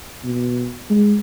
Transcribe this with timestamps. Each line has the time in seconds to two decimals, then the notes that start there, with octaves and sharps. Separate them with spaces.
0.24 B2
0.90 G#3